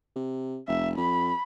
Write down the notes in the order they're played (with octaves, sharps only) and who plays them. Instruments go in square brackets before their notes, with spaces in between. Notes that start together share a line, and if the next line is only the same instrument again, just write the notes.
[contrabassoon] C3
[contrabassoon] F1 [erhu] E5
[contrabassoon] F2 [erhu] B5